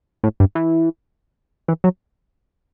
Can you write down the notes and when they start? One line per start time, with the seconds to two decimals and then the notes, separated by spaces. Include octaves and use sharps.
0.24 A2
0.40 G2
0.55 E3
1.68 E3
1.84 F#3